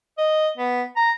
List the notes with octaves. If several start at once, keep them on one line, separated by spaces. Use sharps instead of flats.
D#5
B3
A#5